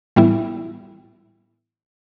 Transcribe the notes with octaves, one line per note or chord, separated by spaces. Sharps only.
A2 E3 G3 B3 E4